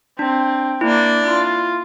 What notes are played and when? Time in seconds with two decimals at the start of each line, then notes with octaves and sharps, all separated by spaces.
0.19 C4 D4
0.81 A#3 D4 E4
1.25 F4